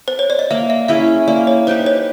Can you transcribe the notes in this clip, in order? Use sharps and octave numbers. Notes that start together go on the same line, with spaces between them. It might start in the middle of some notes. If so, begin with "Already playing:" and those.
C5
C#5
D5
D#5
A#3 E5
E5
C#4 E4 G#4 E5
A#3 D5
C#5
D#4 G4 B4 C5
C#5